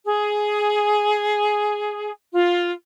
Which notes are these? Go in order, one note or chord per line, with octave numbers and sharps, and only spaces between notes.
G#4
F4